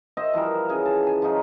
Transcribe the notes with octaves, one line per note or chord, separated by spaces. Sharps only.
F#4 C5 D#5 E5
E3 F3 G3 A#4
C#3 G#4 G#5
A5
G#5 B5
F3 F#3 D#4 F4